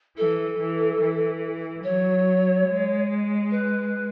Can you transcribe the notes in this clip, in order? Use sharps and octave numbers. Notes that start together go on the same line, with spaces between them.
E3 A4
E3
E3
F#3 C#5
G#3
B4